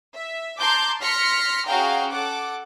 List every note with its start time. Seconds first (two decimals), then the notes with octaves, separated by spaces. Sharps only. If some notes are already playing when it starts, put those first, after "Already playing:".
0.15 E5
0.58 A5 A#5 C6 D6 G6
1.01 C6 F6 A#6 B6 C#7
1.67 C#4 F#4 G#4 F5 G5 A#5
2.11 A4 F#5 D6